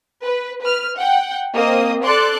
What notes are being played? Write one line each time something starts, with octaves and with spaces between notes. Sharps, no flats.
B4
B4 F6
F#5 G5
A#3 C4 D#5 D#6
A4 D5 C6 D6 F#6